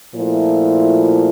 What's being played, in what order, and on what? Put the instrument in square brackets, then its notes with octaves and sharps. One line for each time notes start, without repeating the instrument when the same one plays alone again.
[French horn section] A#2 F3 A3 E4